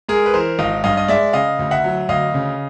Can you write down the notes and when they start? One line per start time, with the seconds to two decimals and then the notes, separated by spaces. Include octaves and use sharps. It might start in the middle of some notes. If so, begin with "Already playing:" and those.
0.08 G#3 G#4 A#4
0.26 B4
0.34 E3 A#4 C5
0.59 G#1 D#5 F5
0.84 G2 D#5 F5
0.97 D#5
1.08 G#3 D5 E5
1.33 C#3 D#5 F5
1.59 D2
1.71 E5 F#5
1.84 F#3
2.09 D2 D#5 F5
2.34 C#3